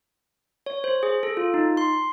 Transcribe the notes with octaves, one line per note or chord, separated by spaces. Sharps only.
C#5
C5
G#4
A4
F4
D#4
C6